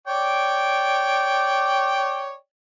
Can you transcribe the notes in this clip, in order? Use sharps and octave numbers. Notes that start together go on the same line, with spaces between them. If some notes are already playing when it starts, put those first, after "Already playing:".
C#5 D5 G5